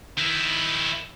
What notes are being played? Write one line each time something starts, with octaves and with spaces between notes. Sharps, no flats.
D#3 E4